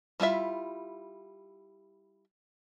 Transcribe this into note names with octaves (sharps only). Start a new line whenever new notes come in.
G3 E4 F4 E5